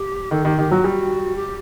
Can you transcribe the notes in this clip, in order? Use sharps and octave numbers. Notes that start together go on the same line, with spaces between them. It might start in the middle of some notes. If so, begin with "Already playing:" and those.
Already playing: G4
D#3 A4
D#3 G4
D#3 G4
F#3 F#4
G3
G4